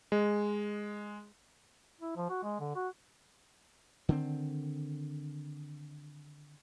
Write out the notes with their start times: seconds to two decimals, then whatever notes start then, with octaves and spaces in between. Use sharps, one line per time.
0.12 G#3
2.01 E4
2.17 F3
2.30 F#4
2.44 G#3
2.60 D3
2.76 F#4
4.09 D3 D#3 B3 C4